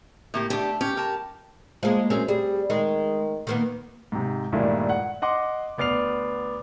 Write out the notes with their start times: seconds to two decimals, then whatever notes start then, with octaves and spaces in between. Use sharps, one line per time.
0.34 A2 A#3 G4
0.50 A3 D4 G4
0.81 C#4 G4
0.97 A#4 A5
1.83 F3 G#3 A#3
2.10 F#2 C4 C#4 G#4
2.28 G3 G#4
2.70 D#3 G#3
3.47 D#3 A#3 B3
4.12 G#2 C3
4.52 G2 A#2 D#3 G#3 A3 E4
4.89 F#5
5.22 D#5 F#5 C6 D6
5.78 D2 B3 D5 F6 C7 F7